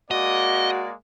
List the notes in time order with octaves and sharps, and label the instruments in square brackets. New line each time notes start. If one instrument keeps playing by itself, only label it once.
[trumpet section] G#3 A#3 D5 [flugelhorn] F#4 [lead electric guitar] D#5